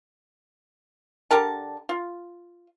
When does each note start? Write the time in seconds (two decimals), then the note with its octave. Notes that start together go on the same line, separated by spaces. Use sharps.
1.31 D3 G4 A#4 A5
1.89 F4